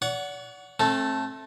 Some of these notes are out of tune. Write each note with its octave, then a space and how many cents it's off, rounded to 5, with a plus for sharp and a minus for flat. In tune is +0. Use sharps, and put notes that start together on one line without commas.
D5 -40 F#5 +0 C#6 +30
A3 -5 C4 +40 A4 +0